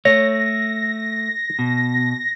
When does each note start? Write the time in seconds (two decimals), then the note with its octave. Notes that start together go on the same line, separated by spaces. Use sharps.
0.05 A3 C#5 A#6
1.59 B2